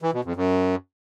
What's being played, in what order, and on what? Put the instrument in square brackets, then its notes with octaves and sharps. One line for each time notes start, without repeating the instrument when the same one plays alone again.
[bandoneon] E3
B2
F2
F#2